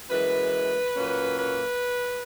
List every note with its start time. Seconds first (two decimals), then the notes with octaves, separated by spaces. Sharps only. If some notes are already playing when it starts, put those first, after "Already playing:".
0.10 F#2 E3 G#3 B4
0.95 A#2 F#3 A#3 C#4
1.37 B4